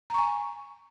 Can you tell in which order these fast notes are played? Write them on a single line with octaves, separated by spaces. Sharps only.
A#5 C#6 G#5